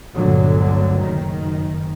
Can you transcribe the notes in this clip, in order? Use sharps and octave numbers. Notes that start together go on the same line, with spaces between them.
G1 D2 A#2 D3 F#3
F#1 D#3